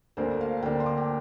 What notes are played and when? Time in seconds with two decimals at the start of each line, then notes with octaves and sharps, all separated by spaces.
0.17 D2 D3 A#3 D4 C5
0.41 F5
0.62 D2 D3 A#3 D4 G5
0.80 C6
0.86 D6
0.98 G5